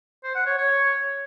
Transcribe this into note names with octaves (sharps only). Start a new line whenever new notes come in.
C5
F#5
C#5
C#5